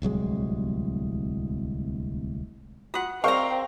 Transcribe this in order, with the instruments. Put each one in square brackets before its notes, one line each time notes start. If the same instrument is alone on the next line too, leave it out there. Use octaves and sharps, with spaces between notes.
[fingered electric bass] D1 C2 F#3 G#3
[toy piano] F4 F#4 [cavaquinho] F#5 D#6
[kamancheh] C4 [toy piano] G#4 A#4 D5 [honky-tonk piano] F5 G5 [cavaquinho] A#5 C#6